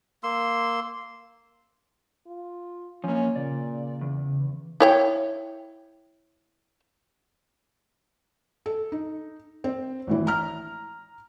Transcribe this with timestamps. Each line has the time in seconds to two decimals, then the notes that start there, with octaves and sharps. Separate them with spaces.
0.23 A#3 C6 E6
2.27 F4
3.04 F3 A#3 C#4
3.36 A#2 C#3 D5
4.01 E2
4.80 E4 C#5 G5
8.66 A4
8.92 D#4
9.64 C4
10.07 G#1 A2 E3
10.27 A#5 F6